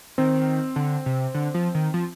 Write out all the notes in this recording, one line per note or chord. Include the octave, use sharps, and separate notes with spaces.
D#3 C4
D3
C3
D3
F3
D#3
F3